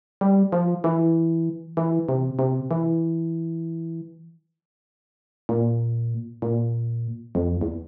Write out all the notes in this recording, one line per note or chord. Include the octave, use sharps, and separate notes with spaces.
G3
F3
E3
E3
C3
C3
E3
A#2
A#2
F2
E2